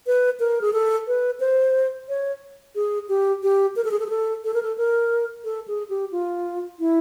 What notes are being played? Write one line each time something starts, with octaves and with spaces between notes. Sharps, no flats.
B4
A#4
G#4
A4
B4
C5
C#5
G#4
G4
G4
A#4
A4
G#4
A4
G#4
A4
A4
A#4
A4
A#4
A4
G#4
G4
F4
E4